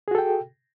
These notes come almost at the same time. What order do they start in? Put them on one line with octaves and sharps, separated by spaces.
G#4 F#4 A4 G5